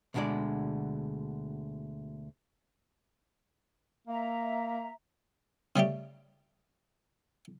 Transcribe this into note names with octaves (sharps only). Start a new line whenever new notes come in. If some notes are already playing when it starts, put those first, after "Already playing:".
D2 B2 D3 E3 G#3 D5
A#3 E5 A#5
C#3 G3 A3 G4